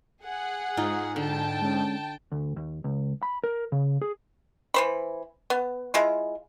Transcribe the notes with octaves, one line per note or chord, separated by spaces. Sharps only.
G#4 F#5
G#2 D#4 F4
D3 G5 A5
G#3 C#4
D2
D#2
C#2
B5
A#4
C#3
G#4
E3 C5 B5
B3
G#3 E4 F4